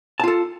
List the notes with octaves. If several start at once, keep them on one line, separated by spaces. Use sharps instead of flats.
F4 A4 A5